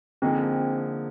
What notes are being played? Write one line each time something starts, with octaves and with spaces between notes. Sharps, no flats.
D3 F3 A#3 C4 D#4 G#4